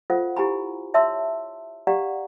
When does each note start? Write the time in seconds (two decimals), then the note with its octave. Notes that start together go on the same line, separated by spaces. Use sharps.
0.10 F4 A4 C5 F5 F#5
0.37 E4 G4 G#5 A#5 B5
0.94 C#5 E5 A5 C6 E6
1.87 G4 D5 F5 F#5 A#5